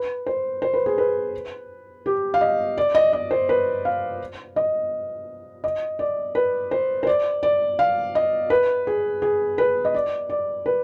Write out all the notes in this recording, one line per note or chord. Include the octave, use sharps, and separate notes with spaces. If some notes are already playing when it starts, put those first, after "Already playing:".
Already playing: B4
C5
C5
B4
G#4
B4
G4
F5
D#5
D5
D#5
D#5
C5
B4
F5
D#5
D#5
D5
B4
C5
C5
D5
D5
F5
D#5
B4
G#4
G#4
B4
D#5
D5
D5
B4